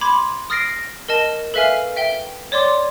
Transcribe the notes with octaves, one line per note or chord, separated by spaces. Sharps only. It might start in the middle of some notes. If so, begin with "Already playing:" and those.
B5 C6 D6 G#6
D#6 F6 A6 A#6 C7 D7
A#4 D#5 A5
A4 B4 E5 F5 G#5 F6
E5 G5 G7
C#5 D5 C6 D6